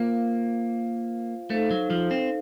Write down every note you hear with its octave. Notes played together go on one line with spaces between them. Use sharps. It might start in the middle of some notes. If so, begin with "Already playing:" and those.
Already playing: A#3 F4 C5 F5
A3 D#4 A4 C5 F5
F#3
F3
C4